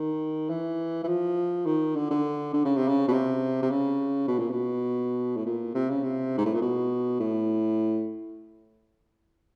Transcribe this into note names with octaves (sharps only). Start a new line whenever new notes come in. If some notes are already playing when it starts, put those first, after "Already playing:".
Already playing: D#3
E3
E3
F3
D#3
D3
D3
D3
C#3
C3
C#3
B2
C3
C3
C#3
B2
A#2
B2
A2
A#2
C3
C#3
C3
G#2
A2
A#2
B2
A2